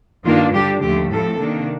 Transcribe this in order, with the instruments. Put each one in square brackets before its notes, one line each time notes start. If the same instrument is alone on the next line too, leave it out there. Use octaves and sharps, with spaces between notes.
[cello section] G2 D#3 A#3 D4 F4
D3 G3 D4 G4
D#2 D3 F3 A3 G4
A2 F3 A3 C4 A4
C3 D#3 A#3 D4